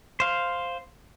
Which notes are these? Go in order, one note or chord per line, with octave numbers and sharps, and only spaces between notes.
C5 F5